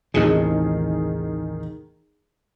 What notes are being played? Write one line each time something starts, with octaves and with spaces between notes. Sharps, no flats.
A1 D#2 C3 D#3 G#4